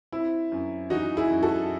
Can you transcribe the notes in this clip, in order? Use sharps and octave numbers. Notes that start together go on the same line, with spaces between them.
C4 E4
F#2
E3 D#4 F#4
E4 G#4
F#2
F#4 A4